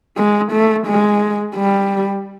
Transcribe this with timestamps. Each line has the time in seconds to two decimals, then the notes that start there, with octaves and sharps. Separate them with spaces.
0.17 G#3
0.52 A3
0.87 G#3
1.55 G3